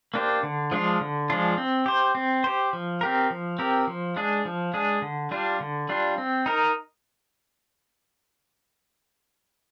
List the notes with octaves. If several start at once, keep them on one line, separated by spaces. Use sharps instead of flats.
A#3 D4 G4 C5
D3
F3 G#3 D4 F4
D3
F3 G#3 D4 F4
C4
G4 C5
C4
G4 C5
F3
C4 G4 A#4
F3
C4 G4 A#4
F3
G#3 D4 G#4
F3
G#3 D4 G#4
D3
G3 D4 F4
D3
G3 D4 F4
C4
D#4 A#4